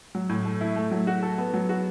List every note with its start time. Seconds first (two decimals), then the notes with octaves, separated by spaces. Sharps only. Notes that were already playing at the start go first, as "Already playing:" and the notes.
0.15 F#3
0.29 A2
0.45 A3
0.61 E4
0.76 A3
0.91 F#3
1.07 F#4
1.23 A4
1.38 B3
1.54 F#3
1.69 F#4